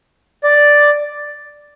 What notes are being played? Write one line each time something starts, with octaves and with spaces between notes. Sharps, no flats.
D5